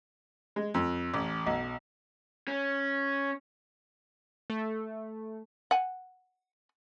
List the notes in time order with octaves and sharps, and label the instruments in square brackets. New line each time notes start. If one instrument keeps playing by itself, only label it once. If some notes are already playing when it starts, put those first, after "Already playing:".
[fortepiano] G#3
F2
A1
B1
[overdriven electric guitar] C#4
[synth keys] A3
[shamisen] F#5 G#5